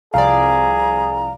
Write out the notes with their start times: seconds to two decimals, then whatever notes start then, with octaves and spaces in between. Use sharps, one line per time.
0.14 C2 F3 G#4 D5 F5 A#5